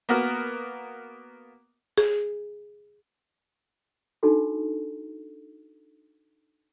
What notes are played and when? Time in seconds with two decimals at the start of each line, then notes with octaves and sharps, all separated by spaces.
0.09 A#3 B3 F#4 A#4
1.98 G#4
4.23 D4 D#4 F#4 A4 B5